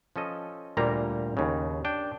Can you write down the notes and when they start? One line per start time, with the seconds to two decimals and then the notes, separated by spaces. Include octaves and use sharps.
0.16 F3 C#4 A4 D#5
0.77 D2 A#2 G3 A#3 A#5
1.37 D#2 C#3
1.85 D4 G5